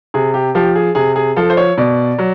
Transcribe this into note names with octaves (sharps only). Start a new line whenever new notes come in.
C3 G#4
G4
F3 G4
G#4
C3 G#4
G#4
F3 A4
C5
C#5
B2 D5
F#3